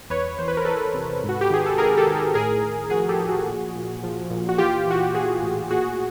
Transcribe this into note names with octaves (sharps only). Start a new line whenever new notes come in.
E2 B4 C#5
E3 C5
B4
A#4
E3 A4 B4
C3
G#2
F#4
G4
D#3 G#4
A4
D#3 G#4 A#4
G4 A4
D#3
G#4 A#4
A2 G#4 A#4
A2
F3 F#4 G#4
G4 A4
F3
F#4 G#4
A#2
A#2
F3
A#2
F#4
E3 F4 G4
E3 F#4
G4
E3 F#4 G#4
A2
A#2 F#4 G#4